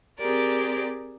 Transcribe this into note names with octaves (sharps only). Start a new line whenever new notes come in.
C4 G4 G#4 A#4 D5